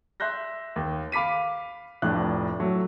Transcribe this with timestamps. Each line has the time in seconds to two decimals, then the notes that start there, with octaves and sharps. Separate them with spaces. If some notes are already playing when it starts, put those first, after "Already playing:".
0.20 E5 C6 F#6 G6 A#6
0.76 D#2
1.12 F5 B5 D6 B6 D#7
2.02 F1 F2 A2 D4 F#6
2.60 F#3 A3